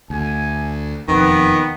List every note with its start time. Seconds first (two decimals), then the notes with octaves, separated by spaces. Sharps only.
0.10 D2 G#5
1.08 E1 F2 D#3 B3